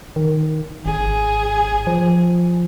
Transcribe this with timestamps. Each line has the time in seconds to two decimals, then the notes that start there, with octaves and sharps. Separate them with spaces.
0.16 D#3
0.86 G#1 G#4
1.87 F3